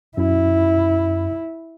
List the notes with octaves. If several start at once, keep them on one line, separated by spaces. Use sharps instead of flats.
F#2 E4